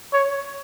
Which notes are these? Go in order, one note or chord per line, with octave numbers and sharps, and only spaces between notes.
C#5